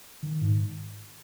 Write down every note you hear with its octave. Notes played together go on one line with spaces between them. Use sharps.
D#3
G#2